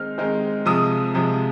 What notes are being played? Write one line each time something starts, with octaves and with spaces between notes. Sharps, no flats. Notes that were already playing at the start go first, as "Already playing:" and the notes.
Already playing: D#3 G#3 C4 D#4 F6
D#3 G#3 C4 D#4
C3 F3 G#3 D#6
C3 F3 G#3